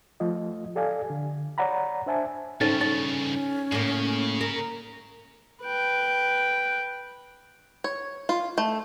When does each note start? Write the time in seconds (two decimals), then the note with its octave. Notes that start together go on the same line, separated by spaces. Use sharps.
0.20 F3 A3 F4 D#5
0.75 G4 A4 D5 F5 G#5
1.10 D3
1.58 C#5 D5 F#5 A#5 B5
2.06 D4 C5 E5 G#5 A5
2.61 G2 C#3 C4 C#4 D#4 A4
2.81 C#4 D#4 C#5
3.72 A2 C#3 A#3
4.41 A#4
5.63 B4 G5
7.84 C#5
8.29 F4
8.58 A3